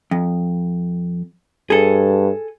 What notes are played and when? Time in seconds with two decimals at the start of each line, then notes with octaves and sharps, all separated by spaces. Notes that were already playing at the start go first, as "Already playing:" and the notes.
0.11 F2
1.70 G2 G#4 A4